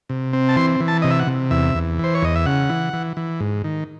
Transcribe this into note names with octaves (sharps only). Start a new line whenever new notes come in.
C3
C4
A5
E3 C6
E3
A5
C3 D#5
E5
F#5
C3
E2 E5
E2
E3 C5
C#5
E2 D#5
E5
C#3 F#5
E3
E3
E3
G#2
D#3